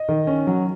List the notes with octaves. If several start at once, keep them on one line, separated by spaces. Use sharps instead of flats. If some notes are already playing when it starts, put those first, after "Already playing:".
Already playing: D#5
D#3
C#4
F#3